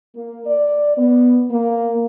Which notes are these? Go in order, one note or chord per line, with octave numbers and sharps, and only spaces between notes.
A#3
D5
B3
A#3